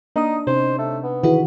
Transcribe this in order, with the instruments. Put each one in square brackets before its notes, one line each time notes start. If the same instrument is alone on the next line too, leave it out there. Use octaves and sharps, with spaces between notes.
[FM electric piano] A#3 D#6 [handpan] D4 [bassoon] D#4
[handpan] C3 D#4 [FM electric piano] C#4 [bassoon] C5
[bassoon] A3
B3
[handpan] D#3 E3 F#4 [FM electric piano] E4 G#4 B4